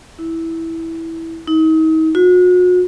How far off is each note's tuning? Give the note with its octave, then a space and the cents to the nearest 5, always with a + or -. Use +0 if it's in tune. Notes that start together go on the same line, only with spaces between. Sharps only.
E4 -10
D#4 +40
F#4 -40